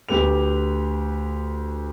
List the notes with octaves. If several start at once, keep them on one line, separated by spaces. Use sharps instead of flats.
D2 G4 B4 F7